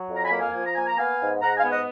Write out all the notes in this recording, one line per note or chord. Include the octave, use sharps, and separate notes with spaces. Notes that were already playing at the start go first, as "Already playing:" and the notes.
Already playing: F#3
F2
A#5
G#5 B5
A#3
F5 G#5
F3 G#5
A#5
A#3 G#5
A#5
B3 F5 G#5
G#2
G#2 F#5 A#5
F5 G#5
B3
D#5 F#5